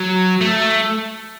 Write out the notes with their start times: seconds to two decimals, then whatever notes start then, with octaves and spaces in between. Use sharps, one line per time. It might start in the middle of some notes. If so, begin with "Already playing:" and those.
Already playing: F#3
0.41 A3